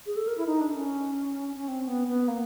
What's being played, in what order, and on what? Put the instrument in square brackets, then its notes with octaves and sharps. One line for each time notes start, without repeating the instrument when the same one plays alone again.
[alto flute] G#4
A4
A#4
E4
D#4
D4
C#4
C#4
C4
B3
B3
A#3